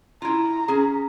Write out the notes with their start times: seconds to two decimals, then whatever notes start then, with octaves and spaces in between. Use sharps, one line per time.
0.22 E4 F4 A#5
0.68 C#4 G#4